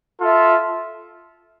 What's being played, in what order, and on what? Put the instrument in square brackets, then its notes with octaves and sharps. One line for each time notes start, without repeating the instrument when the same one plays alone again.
[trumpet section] F4 A4 E5